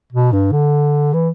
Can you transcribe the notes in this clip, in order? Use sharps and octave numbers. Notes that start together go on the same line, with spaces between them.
B2
G2
D3
E3